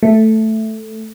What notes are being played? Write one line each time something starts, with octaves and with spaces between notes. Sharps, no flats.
A3